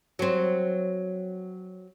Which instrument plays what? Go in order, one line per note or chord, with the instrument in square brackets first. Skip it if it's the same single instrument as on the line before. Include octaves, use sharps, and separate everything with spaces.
[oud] F#3 C4